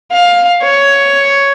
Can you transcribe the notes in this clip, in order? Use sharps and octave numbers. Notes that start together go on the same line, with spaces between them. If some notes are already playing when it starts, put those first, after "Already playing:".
F5
C#5